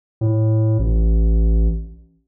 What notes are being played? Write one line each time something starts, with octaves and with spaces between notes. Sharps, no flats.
A2
A1